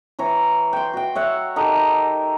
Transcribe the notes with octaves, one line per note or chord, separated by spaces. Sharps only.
E3 C#5 A#5
G5 C6
F#4 G5
C#5 E5 F#5
D#4 G4 A4 A#4